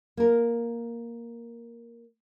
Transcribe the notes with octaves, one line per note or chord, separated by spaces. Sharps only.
A#3 A#4